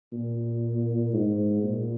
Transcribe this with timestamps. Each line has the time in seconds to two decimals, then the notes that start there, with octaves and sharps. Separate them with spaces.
0.13 A#2
1.14 G#2
1.63 A#2